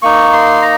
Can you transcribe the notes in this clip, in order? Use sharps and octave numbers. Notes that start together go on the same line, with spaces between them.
A#3 D#4 C#6
C6
A#5